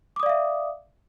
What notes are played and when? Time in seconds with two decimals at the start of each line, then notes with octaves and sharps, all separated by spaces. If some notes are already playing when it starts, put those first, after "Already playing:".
0.16 D6
0.20 D#6
0.23 D5
0.26 F5
0.29 E5